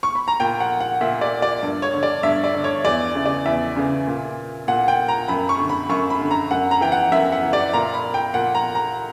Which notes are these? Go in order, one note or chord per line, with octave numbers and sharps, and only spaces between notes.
C#6
B5
A#5
A#2 G5
F#5
F#5
A#2 E5
D5
D5
G2
C#5
D3
D5
G2 E5
D5
D3
C#5
E2 D5
C#3 E3
D5
E2 E5
C#3 E3
A#2
A#2 F#5
G5
A#5
F#2 B5
C#6
D3
B5
F#2 C#6
B5
D3
A#5
F#2 F#5
A#5
E3 G5
F#5
F#2 E5
F#5
E3
D5
A#2 A#5
B5
G5
A#2 F#5
A#5
A#5